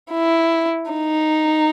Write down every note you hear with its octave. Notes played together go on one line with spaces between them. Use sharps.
E4
D#4